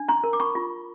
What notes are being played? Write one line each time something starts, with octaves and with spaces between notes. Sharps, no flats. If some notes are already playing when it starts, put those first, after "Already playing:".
Already playing: D4
A#5 C6
A#4
D6
B5 C#6
F4